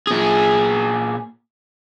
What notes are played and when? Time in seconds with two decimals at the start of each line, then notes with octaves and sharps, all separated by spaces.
0.07 A#2 G#4